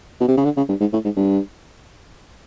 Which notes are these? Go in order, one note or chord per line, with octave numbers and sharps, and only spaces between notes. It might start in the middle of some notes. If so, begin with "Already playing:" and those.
B2
C3
C#3
D3
C#3
G2
G#2
A2
G#2
G2